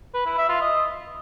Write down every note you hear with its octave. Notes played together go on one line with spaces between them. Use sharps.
B4
E4
E5
F4
D#5